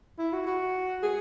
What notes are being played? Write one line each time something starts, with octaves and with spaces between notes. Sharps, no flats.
E4
F#4
F#4
G#4